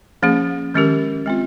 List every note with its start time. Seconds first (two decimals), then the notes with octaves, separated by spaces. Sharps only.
0.23 F3 A#3 C#4 G#4
0.74 D#3 G#3 C#4 G4 A#4
1.26 G#3 C4 F4